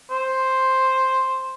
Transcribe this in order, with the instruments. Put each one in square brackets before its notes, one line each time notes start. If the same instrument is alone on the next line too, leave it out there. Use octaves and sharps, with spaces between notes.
[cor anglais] C5